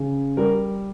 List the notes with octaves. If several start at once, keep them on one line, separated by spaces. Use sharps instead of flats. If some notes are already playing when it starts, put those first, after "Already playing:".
Already playing: C#3
G3 A#4